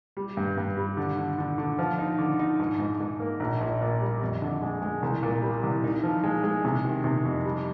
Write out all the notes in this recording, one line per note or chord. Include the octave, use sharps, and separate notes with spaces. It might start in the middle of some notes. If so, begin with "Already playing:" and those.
G3
G2
G2
G3
D3
D3
D3
D3
F3
D#4
D3
D#4
G#2
G#2
G#2
A#3
A#1
A#1
A#2
G3
F2
D3
G#3
G#3
C2
A#2
G3
C2
D#4
F3
G#3
G#3
C3
D#3
C3
F2
G3